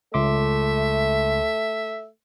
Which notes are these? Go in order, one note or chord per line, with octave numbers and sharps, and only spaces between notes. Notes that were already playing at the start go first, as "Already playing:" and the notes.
C#2 A3 E5 C6 D6